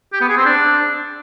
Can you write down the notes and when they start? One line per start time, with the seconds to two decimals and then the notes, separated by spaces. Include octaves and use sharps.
0.13 G4
0.21 B3
0.29 G#4
0.37 C4
0.45 D4